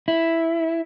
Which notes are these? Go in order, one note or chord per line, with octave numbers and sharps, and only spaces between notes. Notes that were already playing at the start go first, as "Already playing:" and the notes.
E4